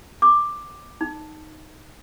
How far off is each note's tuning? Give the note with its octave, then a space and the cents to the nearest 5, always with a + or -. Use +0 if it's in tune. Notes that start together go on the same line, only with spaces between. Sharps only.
D6 +10
D#4 -5